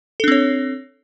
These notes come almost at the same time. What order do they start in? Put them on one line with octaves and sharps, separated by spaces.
A4 D4 C4 C#5